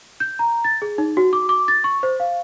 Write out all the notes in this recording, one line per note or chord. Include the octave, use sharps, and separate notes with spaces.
G6
A#5
A6
G#4
D#4
F#4
D6
D6
A6
C#6
C5
F5